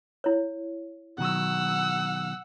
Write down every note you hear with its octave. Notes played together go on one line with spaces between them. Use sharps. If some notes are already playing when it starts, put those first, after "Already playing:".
E4 C#5
B2 D#3 F#3 F#5 E6